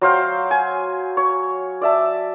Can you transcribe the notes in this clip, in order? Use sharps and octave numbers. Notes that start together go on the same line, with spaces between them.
F#3 C5 F5 G5
G#5
C#5
D5 E5 A5